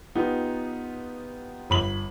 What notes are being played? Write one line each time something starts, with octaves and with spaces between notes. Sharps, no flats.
B3 D#4 F4 G4
G1 B5 F#7